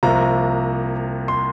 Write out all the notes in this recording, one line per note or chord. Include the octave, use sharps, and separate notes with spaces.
C2 C3 F3 A#3 A#5
C6